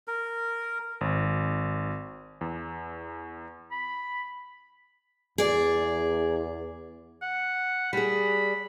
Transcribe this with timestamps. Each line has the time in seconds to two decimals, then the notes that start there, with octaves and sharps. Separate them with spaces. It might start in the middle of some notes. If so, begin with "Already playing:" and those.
0.08 A#4
1.01 G#1
2.41 E2
3.72 B5
5.38 E2 G#4 D5
7.22 F#5
7.93 G3 G#4 B5